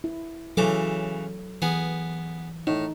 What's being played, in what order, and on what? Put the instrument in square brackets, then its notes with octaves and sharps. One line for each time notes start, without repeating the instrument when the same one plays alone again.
[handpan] E4
[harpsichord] C#3 E3 D6 [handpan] F#3 A4
[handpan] E3 [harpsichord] B3 G#4
[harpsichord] A2 [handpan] D#4